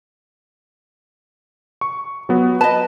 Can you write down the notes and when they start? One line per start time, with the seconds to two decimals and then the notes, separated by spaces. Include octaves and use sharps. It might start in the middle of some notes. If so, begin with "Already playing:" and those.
1.81 C#6
2.29 F#3 B3 F#4
2.61 B4 D#5 A5